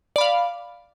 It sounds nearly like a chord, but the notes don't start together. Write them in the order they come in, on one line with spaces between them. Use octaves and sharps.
D5 B5 F5